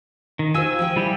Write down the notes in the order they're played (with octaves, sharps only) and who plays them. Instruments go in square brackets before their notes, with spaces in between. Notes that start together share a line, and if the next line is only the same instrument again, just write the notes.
[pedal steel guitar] D#3
[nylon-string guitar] F4 G4 C5 [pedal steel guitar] G#5 E6
[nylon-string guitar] F3 G#4 G5
[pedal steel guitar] G3 E4 G4